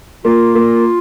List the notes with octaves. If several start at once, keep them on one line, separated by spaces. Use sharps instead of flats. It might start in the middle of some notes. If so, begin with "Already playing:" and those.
A#3 F4
A#3